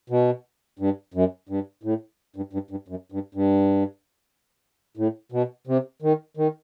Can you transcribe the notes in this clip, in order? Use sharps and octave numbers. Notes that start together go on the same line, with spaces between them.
B2
G2
F#2
G2
A2
G2
G2
G2
F#2
G2
G2
A2
B2
C3
D#3
D#3